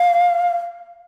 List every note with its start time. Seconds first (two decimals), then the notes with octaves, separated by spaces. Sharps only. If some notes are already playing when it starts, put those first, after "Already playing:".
Already playing: F5